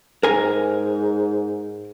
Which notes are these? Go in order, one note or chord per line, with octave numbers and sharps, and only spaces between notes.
G#2 A#4 G#5